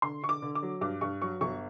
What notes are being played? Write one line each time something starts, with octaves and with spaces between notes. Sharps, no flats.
D3 C6
D3 C#6
D6
D3
D6
F#3
G2 D6
G2 C#6
F#3 C#6
G1 C#6